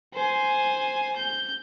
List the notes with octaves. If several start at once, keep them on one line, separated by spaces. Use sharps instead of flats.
C5 G#5
G6